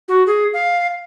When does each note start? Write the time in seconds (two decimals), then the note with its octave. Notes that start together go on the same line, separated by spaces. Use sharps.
0.08 F#4
0.27 G#4
0.54 F5